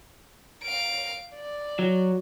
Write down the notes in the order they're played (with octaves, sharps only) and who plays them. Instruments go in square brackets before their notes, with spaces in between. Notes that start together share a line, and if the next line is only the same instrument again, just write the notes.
[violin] F5 D7
D5
[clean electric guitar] F#3